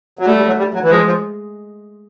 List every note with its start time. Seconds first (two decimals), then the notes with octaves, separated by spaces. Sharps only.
0.19 F#3
0.26 G3 A3
0.36 G3
0.47 F#3
0.58 G3
0.74 F#3
0.82 E3
0.90 F3 G#3
1.06 F3